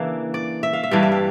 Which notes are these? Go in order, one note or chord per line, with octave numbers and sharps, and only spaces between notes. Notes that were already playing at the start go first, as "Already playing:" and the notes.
Already playing: C#3 E3 A#3 D4 E5
D5
E5
F5
E5
G2 E3 G3 D4 F5
E5
F5